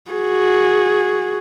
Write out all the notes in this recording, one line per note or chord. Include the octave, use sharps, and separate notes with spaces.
F#4 G#4